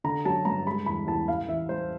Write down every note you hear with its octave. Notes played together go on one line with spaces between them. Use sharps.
D3 A#5
F#3 A5
G2 A#5
G#3 B5
E2 B5
E2 A5
A2 F5
E3 E5
G3 C5